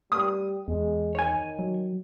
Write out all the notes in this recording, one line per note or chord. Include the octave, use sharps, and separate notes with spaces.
G3 D#6
E2 G#3
D#3 C#5 G#5
F#3